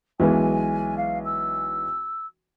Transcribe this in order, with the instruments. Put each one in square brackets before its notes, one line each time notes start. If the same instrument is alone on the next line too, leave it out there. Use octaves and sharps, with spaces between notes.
[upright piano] B1 E3 G#3 [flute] G#5
[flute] F5
E6